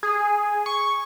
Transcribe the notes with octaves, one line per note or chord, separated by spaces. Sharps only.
G#4
C#6